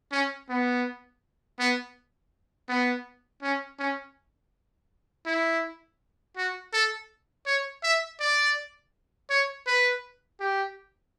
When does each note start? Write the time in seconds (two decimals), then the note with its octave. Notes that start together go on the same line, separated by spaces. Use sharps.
0.12 C#4
0.49 B3
1.59 B3
2.69 B3
3.42 C#4
3.79 C#4
5.26 E4
6.37 F#4
6.73 A4
7.46 C#5
7.83 E5
8.20 D5
9.30 C#5
9.67 B4
10.40 G4